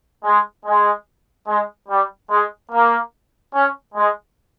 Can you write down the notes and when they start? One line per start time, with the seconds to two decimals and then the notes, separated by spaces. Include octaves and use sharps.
0.23 G#3
0.65 G#3
1.47 G#3
1.89 G3
2.29 G#3
2.71 A#3
3.53 C#4
3.95 G#3